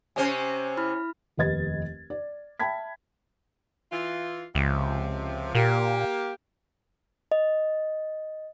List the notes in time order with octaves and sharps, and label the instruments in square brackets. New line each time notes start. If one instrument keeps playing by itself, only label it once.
[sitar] C3 C#4 C5 [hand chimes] G#5
[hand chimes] E4 B5 F6
[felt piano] F1 D#2 B4 D#5 G#6 A6
D5
E5 G5 A5 B5 G#6 B6
[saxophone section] E3 F4
[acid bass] C#2 [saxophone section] C3 F3
[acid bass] A#2 [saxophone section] A#3 G4
[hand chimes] D#5